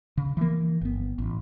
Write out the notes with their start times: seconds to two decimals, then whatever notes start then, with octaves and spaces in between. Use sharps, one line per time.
0.17 C#3
0.37 E3 F3 A#3
0.81 G1 B3
1.18 A1